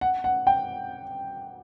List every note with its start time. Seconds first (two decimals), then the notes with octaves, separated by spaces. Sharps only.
0.01 F#5
0.24 F#5
0.47 G5